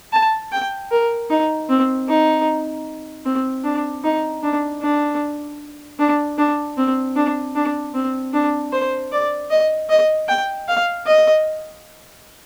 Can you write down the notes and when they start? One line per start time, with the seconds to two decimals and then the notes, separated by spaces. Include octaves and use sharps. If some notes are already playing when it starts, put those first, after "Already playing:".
0.12 A5
0.52 G5
0.91 A#4
1.30 D#4
1.69 C4
2.08 D#4
3.26 C4
3.64 D4
4.04 D#4
4.43 D4
4.82 D4
5.99 D4
6.38 D4
6.77 C4
7.16 D4
7.55 D4
7.94 C4
8.33 D4
8.73 C5
9.12 D5
9.50 D#5
9.90 D#5
10.28 G5
10.68 F5
11.06 D#5